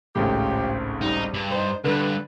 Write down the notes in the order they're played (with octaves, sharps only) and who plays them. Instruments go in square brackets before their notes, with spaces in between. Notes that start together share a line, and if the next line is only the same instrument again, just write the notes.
[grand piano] G#1 C#2 A2 [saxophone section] C#3 F4 G4
[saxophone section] G3 [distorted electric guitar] D#4
[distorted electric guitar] G2
[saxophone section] D#4 C5
[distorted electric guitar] C#2 G2 [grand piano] D3 [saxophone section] B4